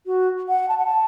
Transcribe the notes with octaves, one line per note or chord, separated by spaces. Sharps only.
F#4
F#5
A5
F#5
A5